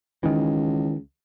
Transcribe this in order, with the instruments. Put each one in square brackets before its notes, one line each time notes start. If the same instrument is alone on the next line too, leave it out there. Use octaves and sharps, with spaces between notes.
[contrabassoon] C#2 [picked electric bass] D#3 E3